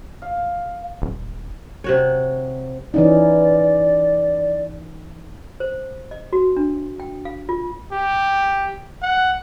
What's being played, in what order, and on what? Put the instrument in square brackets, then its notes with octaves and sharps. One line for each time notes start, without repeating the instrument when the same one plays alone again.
[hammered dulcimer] F5
[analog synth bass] D#1
[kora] C3 F#4 C#5
[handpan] E3 C#4 D#4 [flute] D5
[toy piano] C5
D#5
F#4
D4
G5
F5
F4
[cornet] G4
F#5